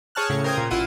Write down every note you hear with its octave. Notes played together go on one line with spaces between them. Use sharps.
G#4 C#5 A5 F6 F#6
A2 C#3 C#7
A#4 C5 G5 D#6 G#6
A#2
A1 E4 F4 F#5 D#7